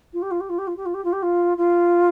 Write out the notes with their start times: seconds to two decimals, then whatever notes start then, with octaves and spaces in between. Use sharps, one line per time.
0.13 F4
0.22 G4
0.31 F4
0.40 G4
0.49 F4
0.58 G4
0.67 F4
0.76 G4
0.85 F4
0.94 G4
1.04 F4
1.12 G4
1.22 F4
1.57 F4